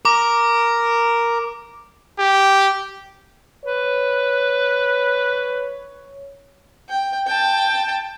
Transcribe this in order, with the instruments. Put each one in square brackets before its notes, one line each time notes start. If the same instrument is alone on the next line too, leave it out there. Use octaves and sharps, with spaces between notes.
[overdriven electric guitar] A#4 [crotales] D6
[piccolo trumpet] G4
[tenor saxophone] B4 [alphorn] C#5
[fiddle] G5
G5 A5